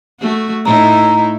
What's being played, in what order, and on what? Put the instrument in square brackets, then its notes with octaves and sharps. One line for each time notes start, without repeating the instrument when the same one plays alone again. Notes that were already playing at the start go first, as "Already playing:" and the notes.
[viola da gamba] A3 F#4
[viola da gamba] A2 D#4 E4 [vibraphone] A#5